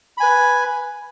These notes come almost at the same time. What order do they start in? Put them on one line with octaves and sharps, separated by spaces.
B5 G#5 B4